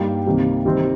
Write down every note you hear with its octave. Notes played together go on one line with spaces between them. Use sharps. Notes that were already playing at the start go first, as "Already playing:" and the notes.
Already playing: G2 G3 A#3 D#4 G5
C2 C3 D#3 A#3
C3 D#3 G3 C4